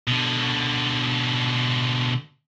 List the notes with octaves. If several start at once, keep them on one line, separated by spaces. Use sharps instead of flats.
B2 D3